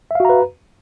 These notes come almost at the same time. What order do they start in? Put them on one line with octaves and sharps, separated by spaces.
E5 F5 F#4 A#5 B4